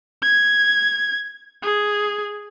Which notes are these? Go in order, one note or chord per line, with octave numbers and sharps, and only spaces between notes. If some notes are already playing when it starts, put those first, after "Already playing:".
G#6
G#4